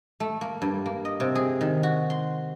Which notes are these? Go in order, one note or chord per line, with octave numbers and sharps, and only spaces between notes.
A3
A#3
G2
A#3
D#5
C3
G#4
D#3
F#4
C6